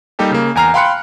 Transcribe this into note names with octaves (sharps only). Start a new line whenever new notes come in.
G3 A#3 D#4 G4 A4
C#3 A#3
E2 G#5 A#5 F6 C7
F5 G5 B5 C6 F#6 C#7